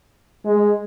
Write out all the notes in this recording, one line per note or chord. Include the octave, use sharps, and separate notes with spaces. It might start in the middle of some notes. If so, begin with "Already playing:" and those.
G#3